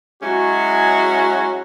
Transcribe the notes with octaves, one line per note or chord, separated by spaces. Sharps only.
F#3 G#3 C#4 E4 F#4